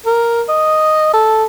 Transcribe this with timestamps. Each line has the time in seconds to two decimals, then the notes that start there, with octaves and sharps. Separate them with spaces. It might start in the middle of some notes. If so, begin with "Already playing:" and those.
0.06 A#4
0.49 D#5
1.13 A4